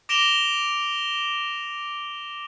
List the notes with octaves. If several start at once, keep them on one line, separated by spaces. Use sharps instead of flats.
D6 A#6 D7 E7 F7 G7